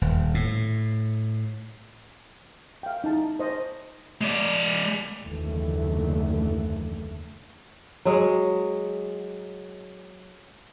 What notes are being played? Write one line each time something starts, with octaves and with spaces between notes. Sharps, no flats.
D#1
A2
F5 G5
D#4 E4 A5
C5 D#5
G#3 D5
F#1 D#2 D3 E3 A3
F#3 G#3